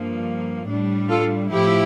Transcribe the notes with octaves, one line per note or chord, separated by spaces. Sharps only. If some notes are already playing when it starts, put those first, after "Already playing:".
Already playing: G2 F3 A#3
A2 G3 D4
F4 A4
A2 F3 E4 G4